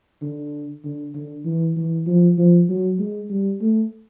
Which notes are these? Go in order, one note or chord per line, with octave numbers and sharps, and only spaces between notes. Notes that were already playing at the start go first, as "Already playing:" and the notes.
D3
D3
D3
E3
E3
F3
F3
F#3
G#3
G3
A3